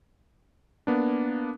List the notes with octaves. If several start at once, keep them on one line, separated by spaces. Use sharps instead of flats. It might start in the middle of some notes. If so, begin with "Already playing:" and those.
A#3 B3 D4